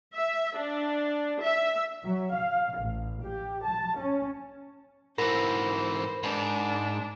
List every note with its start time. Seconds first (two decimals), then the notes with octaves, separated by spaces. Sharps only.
0.16 E5
0.58 D4
1.43 E5
2.04 F#3
2.34 F5
2.79 A1
3.23 G4
3.64 A5
3.98 C#4
5.18 G#2 E3 A#4 C5 B5 A#6
6.23 G#2 D4